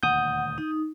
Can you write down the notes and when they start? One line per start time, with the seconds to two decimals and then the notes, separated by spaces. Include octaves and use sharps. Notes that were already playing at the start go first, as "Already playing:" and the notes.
0.03 D#1 D2 F#5 D#6 G6
0.58 D#4